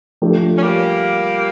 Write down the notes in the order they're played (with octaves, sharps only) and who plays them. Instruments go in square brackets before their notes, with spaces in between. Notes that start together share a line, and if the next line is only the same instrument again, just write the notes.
[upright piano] F3 A3 D4 G4
[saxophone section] C#4
G3 A#3